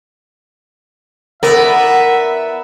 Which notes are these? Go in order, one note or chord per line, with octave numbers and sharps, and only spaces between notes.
B3 E4 A#4 D5 E5